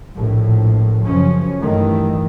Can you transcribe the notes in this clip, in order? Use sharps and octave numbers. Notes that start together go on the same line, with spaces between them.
A#1 A2
F#2 C#3 F3 C#4
G2 D#3 E3 A3